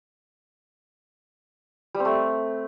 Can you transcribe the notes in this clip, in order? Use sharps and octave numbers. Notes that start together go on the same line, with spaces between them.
G3
C4
A3